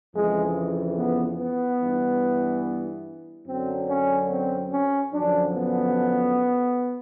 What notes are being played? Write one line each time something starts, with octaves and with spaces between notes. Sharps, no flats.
F2 C#3 E3 G#3
B3
B3
G2 E3
F#2 D3 F#3 C4
C#4
C4
C#4
F#2 D3 F3 D4
B3